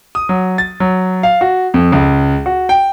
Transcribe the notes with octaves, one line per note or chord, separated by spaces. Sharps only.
D#6
F#3
A6
F#3
F5
F#4
F2
C#2
F#4
G5